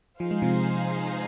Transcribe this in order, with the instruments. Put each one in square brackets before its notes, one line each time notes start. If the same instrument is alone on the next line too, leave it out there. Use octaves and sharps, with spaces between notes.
[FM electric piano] F3 [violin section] D#4 G#4 C5 F5
[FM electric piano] G#3
C3 F3